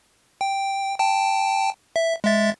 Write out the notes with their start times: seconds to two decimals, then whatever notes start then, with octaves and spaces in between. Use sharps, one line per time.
0.41 G5
0.99 G5 A5
1.96 E5
2.24 G#3 E5 A6